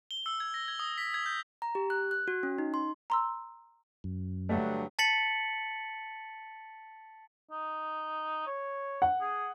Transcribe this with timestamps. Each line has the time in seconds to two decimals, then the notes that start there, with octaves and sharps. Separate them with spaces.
0.11 G7
0.26 E6
0.40 G#6
0.54 A#6
0.68 G#6
0.79 D#6
0.98 B6
1.14 G#6
1.26 G6
1.62 A#5
1.75 G4
1.90 F#6
2.11 F#6
2.28 F#4
2.43 C#4
2.58 D#4
2.74 C6
3.10 A#5 C6 E6
4.04 F#2
4.49 G2 D3 F#3 A3
4.99 A5 A6 B6 C#7 F#7
7.51 D#4
8.47 C#5
9.02 F#5
9.21 G#4